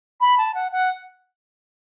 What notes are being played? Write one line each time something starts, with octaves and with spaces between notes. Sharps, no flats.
B5
A5
F#5
F#5